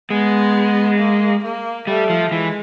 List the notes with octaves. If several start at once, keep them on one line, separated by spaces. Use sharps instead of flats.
G#3 B3
A#3
A#3
G3 A3
F3
E3 G#3